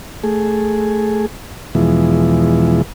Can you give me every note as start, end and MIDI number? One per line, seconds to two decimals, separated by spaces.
0.24 1.26 57
0.24 1.26 68
1.75 2.82 40
1.75 2.82 47
1.75 2.82 52
1.75 2.82 53
1.75 2.82 56